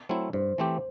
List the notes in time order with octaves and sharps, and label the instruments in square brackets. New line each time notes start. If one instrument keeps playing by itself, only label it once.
[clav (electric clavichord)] F#3 A3 C4 E4
[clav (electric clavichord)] G2 [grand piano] C5
[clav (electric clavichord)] E3 A3 C4 G4